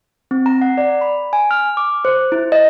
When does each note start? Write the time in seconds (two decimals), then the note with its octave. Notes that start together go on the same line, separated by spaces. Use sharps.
0.31 C4
0.46 A#5
0.61 F#5
0.78 D5
1.01 B5
1.33 G#5
1.51 F6
1.77 D6
2.05 C5
2.32 E4
2.52 D#5